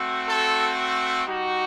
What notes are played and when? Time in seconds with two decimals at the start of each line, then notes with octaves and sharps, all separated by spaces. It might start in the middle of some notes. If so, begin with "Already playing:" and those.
Already playing: A3 C4 F#4
0.26 A4
1.26 G3 D#4 F#4